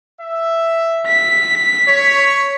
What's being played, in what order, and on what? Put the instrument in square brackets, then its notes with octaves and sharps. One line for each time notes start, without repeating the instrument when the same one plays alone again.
[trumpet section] E5
[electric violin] B6
[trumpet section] C#5